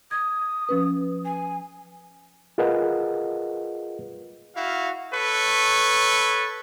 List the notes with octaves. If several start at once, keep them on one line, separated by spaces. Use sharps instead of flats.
D#6 G#6
F3 C#4 B4
G#5
F4 G#4 A#4 B4 D#5 F#5
E4 F#4 F5
A4 B4 C#5 C#6